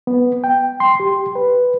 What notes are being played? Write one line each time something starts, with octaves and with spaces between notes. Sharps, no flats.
B3
G5
C6
G4
B4